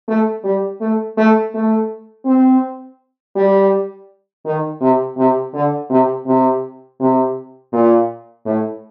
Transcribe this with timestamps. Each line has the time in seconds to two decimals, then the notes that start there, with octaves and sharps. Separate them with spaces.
0.08 A3
0.44 G3
0.81 A3
1.17 A3
1.54 A3
2.26 C4
3.36 G3
4.45 D#3
4.81 C3
5.17 C3
5.54 D3
5.90 C3
6.26 C3
7.00 C3
7.72 A#2
8.46 A2